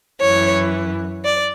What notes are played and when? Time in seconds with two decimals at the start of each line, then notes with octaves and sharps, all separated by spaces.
0.21 F#2 E3 C#5
1.24 D5